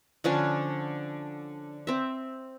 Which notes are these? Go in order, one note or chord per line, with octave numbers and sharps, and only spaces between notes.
D3 F3 C#4 D4
C4 E5